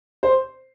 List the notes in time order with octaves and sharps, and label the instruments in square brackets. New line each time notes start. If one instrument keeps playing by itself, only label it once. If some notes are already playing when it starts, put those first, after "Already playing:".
[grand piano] C5